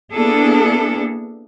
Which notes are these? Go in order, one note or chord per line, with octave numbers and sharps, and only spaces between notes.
A#3 B3 D4 E4 G#4 A4